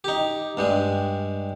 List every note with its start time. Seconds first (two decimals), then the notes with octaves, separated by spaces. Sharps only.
0.04 D#4 G4
0.57 G2 G3 G#3